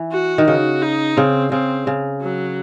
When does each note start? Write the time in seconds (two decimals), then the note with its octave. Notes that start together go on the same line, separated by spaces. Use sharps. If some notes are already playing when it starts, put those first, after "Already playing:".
Already playing: E3
0.12 F#4
0.38 D#3
0.47 C#3 F#4
0.82 D#4
1.17 C#3 C4
1.52 C#3 C4
1.87 C#3
2.21 F#3